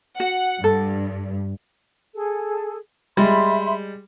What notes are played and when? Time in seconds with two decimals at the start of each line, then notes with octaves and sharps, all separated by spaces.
0.20 F#4 F#5
0.64 G2 A4
2.14 G#4 A4
3.17 G3 G#3 E5 B5 C6